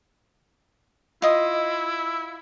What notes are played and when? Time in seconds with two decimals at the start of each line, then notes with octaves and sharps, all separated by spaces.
1.22 E4 F4 D#5 D#6